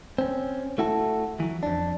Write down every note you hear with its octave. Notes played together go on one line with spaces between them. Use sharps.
C4 C#4
A3 E4 F#4 A4
E3 F#3
F2 D4